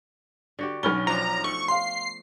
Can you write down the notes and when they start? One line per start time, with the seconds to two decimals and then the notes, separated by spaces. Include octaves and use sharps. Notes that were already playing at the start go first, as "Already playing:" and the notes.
0.59 D3 F#4 G4
0.83 B1 B3 C#4 F6 G7
1.07 F3 D4 A#5
1.44 A3 C#6
1.68 F5 C6 C7